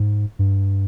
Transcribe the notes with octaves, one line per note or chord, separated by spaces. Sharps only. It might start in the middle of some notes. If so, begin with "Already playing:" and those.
Already playing: G#2
G2